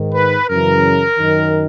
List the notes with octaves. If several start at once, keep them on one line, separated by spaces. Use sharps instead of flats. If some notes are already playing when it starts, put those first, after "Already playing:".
Already playing: G#2 D#3
B4
F#2 C#3 E3 A#4
F#2 D#3